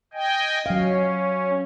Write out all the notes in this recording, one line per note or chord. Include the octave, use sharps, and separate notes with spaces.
D#5 G5 G#5
F#3 C#4 F5